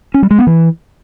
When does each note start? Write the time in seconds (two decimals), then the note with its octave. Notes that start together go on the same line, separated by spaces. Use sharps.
0.14 C#4
0.22 G3
0.31 G#3
0.39 B3
0.47 E3